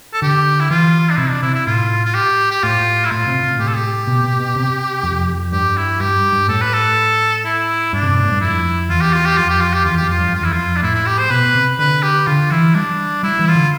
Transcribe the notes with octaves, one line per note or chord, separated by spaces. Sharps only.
A4
D3 G4
E4
E3 F4
D4
C3 E4
D4
C3 E4
E4
A2 F4
F4
G4
G4
A2 F4
E4
A2 F4
C3
C3
A2 G4
A4
G4
B2
B2
B2
C3
F2
F2
G2 G4
E4
G2 G4
G2
A2 A4
B4
A4
E4
G2 D4
C3
B2
A2
G2
F2 E4
E2 F4
G4
F4
G4
F2 F4
G4
F4
G4
E2 F4
G4
F2
F4
G2
F2
F4
E2 E4
F2 F4
D4
A2 E4
E4
G4
C5
B2 B4
C3
D3 B4
G4
D3 F4
E3 E4
G3 D4
G3 E4
E3
F4
D3